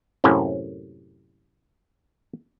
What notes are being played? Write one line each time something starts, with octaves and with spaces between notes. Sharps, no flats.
F#2 A2 C3 A#3 C#4